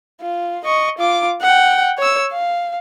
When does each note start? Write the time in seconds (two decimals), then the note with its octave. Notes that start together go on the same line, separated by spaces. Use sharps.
0.21 F4
0.65 D#5 C#6
0.98 F4 D6
1.42 F#5 G5
1.98 C#5 E6
2.32 F5